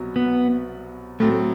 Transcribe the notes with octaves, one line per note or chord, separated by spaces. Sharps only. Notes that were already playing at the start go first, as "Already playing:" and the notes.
Already playing: C2 B2 F#3
B3
A2 F#3 A3 C4